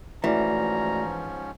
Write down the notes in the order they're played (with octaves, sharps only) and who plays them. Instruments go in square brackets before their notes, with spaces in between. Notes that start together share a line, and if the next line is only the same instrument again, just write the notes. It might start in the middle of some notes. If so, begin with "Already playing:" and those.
[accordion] G#2 F3 C#4 [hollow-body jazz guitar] E3 [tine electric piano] A3 F#4 D5 [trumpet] A#5